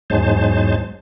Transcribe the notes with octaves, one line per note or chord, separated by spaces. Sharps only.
E2 G#2 F#3 G#3 C5 A5